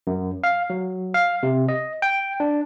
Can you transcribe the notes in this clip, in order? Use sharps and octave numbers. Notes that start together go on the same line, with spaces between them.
F#2
F5
F#3
F5
C3
D#5
G5
D4